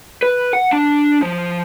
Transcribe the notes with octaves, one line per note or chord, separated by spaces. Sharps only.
B4
F#5
D4
F3